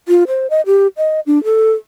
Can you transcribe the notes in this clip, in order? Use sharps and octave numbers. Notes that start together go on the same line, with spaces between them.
F4
C5
D#5
G4
D#5
D4
A4